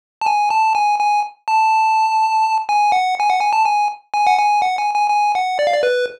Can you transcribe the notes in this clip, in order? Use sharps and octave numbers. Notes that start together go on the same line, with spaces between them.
A5
G#5
A5
G#5
G#5
A5
G#5
F#5
G#5
F#5
G#5
A5
G#5
G#5
F#5
G#5
F#5
G#5
G#5
G#5
F#5
D5
F5
D5
B4